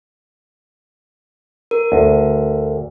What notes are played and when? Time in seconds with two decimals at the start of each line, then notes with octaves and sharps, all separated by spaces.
1.71 A#4
1.92 D2